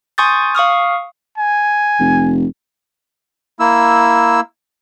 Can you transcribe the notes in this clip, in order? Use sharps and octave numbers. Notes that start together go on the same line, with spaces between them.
G#5 C6 C#6 D#6 G6 A6
F5 C#6 D#6 F6
G#5
F1
A#3 E4 E6